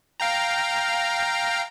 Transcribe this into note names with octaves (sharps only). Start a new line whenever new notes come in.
F5 G5 A#5